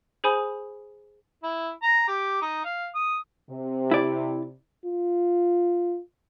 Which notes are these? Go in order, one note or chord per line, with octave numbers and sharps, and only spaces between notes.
G#4 C5 G#5 B5 D#6
E4
A#5
G4
D#4
F5
D#6
C3
E4 D5
F4